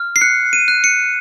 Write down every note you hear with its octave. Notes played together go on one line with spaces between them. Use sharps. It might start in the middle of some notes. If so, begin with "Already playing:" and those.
Already playing: F6
C7
F#6 C#7
D#7
F#6
C#7